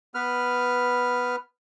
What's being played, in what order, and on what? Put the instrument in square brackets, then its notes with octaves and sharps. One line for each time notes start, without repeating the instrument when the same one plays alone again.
[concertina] B3 B4 F6